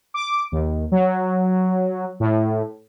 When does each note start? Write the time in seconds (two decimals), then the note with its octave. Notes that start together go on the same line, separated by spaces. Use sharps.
0.14 D6
0.52 D#2
0.92 F#3
2.20 A2